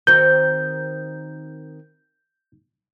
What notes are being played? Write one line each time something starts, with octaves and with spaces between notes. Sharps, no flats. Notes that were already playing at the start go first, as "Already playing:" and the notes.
D#3 C4 F#4 G6